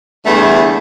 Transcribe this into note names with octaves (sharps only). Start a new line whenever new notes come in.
E2 G2 D3 A3